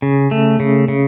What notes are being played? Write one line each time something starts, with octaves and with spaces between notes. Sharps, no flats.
C#3
A3
C#3
C#3